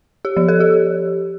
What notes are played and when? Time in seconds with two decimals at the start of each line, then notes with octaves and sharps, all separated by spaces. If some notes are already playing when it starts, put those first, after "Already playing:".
0.25 G4
0.37 F3
0.48 A4
0.60 G4